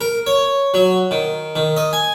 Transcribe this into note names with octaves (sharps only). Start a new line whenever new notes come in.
A#4
C#5
F#3
D#3
D#3
D#5
G#5